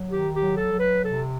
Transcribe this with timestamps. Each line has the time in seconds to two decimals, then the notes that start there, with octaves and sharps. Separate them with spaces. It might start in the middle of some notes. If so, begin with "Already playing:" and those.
Already playing: F#3
0.10 D#3 G4
0.33 G4
0.41 F#3
0.57 A4
0.73 F#3
0.80 B4
1.03 C3 A4